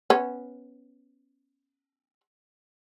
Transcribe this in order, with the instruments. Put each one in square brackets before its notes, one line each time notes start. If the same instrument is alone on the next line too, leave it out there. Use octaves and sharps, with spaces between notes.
[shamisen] B3 C#4